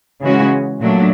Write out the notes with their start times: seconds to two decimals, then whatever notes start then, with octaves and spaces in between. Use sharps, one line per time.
0.22 C#3 E3 G#3 C#4 F#4
0.81 A#2 F#3 A3 D4